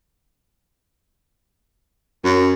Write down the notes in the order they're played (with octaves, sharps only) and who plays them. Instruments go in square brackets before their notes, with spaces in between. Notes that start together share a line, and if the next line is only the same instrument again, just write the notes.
[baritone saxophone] F#2